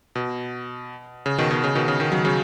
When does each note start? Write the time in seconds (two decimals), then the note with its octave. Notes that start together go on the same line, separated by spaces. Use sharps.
0.15 B2
1.26 C#3
1.38 B2 D#3
1.51 B2 D#3
1.64 C#3
1.75 B2 D#3
1.88 C#3
2.00 B2 D#3
2.12 C#3 F#3
2.24 C#3 F#3